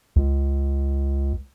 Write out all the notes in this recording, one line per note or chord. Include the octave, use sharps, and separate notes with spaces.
C#2